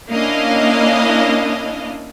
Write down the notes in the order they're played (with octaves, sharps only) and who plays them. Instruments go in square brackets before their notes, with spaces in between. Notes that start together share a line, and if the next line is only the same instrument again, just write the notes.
[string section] A#3 C#4 D4 E4 D#5 F5